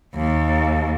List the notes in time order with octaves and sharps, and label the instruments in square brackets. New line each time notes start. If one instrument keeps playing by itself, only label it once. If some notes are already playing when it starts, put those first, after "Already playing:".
[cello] D#2